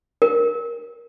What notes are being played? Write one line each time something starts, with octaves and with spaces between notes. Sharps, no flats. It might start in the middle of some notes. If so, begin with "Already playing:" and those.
A#4